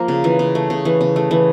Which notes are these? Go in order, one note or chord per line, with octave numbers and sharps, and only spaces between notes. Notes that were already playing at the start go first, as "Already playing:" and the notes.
Already playing: F3 A#3
C#3
E3
C#3
A3
C#3
E3
C#3
A3
E3